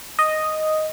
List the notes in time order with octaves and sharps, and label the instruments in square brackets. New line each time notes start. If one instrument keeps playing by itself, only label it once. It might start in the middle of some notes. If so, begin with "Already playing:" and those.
[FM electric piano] D#5